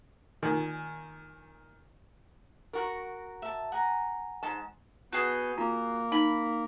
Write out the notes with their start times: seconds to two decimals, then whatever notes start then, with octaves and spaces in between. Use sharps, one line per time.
0.42 A#2 D#3 G#5
2.73 F#4 A#4
3.42 E5 A5
3.72 F#5 G#5 A#5
4.43 G#2 A5
5.12 B3 F#4 G#4 G6
5.58 A#3 F4 A#5
6.12 D#4 B5